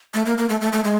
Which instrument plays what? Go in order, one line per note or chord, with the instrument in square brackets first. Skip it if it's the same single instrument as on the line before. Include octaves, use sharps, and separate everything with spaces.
[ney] A3
A#3
A#3
A3
A3
A3
G#3